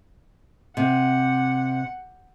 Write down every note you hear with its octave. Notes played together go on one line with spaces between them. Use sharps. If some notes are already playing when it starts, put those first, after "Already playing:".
C3 F#5